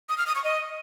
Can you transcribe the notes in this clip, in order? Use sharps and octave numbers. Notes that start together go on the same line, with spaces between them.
D#6
F6
D#6
C#6
D#5